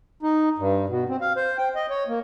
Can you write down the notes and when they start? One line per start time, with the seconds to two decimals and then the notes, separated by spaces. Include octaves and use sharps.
0.23 D#4
0.58 G2
0.89 B2
1.09 C4
1.21 F5
1.36 C5
1.58 G5
1.75 D#5
1.90 C#5
2.08 A#3